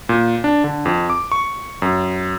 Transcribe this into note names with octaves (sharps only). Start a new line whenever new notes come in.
A#2
D4
D3
F2
D6
C#6
F#2